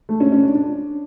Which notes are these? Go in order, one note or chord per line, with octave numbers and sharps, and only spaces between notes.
A3
C#4
C#4
D4
D4